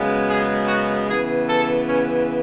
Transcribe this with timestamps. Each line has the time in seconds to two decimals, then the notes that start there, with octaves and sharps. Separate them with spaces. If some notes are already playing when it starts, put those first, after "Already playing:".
Already playing: F#2 C#3 G#3 B3
0.27 G#4
0.67 F#4
1.06 C#3 E3 B3 G#4
1.48 A4
1.87 C#4